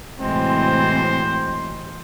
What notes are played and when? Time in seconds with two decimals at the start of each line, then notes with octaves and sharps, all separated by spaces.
0.19 A2 C3 E3 F#3 G#3 C4 C5